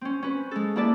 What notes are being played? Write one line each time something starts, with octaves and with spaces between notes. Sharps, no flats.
C4 C#4
C#4 B4
G#3 A4
A#3 E4 B4 D5 A5